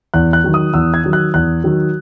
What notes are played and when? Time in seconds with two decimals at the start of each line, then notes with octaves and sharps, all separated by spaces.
0.14 E2 F#6
0.33 F#6
0.44 D#3 F#3
0.54 D#6
0.74 E2 E6
0.94 G#6
1.04 D#3 F#3
1.13 F#6
1.34 E2 F#6
1.64 D#3 F#3